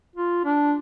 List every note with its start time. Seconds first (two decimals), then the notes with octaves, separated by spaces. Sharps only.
0.16 F4
0.45 D4